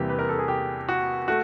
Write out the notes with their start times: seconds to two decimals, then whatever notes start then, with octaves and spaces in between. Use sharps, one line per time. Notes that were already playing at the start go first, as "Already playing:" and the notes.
Already playing: E2 C3 E3 G3 A#3 G4
0.09 B4
0.19 A#4
0.29 A4
0.39 G#4
0.48 G4
0.89 F#4
1.28 A3 F#4